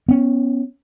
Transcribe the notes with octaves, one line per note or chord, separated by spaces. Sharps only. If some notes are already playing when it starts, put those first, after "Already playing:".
B3 C#4